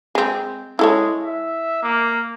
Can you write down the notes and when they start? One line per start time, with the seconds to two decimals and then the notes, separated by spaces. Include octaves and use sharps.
0.15 G#3 C4
0.79 G#3 E4 A4 C#5
1.23 E5
1.82 A#3